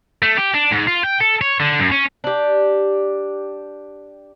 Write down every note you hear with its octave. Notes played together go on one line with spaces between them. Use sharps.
A3
G4
D4
G#2
F4
G5
A4
C#5
D3
F#2
C#4
D4 G4